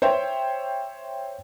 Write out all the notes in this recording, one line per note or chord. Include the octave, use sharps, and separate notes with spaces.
C5 C#5 E5 G5